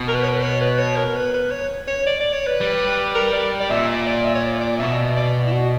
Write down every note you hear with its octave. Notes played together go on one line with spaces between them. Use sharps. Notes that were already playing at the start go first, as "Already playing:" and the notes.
Already playing: B2
A#4
B4
C#5
B4
C#5
B4
C#5
A#4
B4
B4
C#5
C#5
D5
D5
C#5
B4
G3
A#4
D5
D5
A#2 E5
D5
D5
E5
C#5
D5
D5
B2 E5
D5
E4
F#4